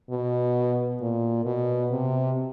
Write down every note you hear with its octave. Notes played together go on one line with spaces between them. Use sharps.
B2
A#2
B2
C3